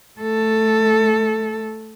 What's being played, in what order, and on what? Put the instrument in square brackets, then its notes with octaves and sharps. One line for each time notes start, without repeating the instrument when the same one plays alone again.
[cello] A3 A4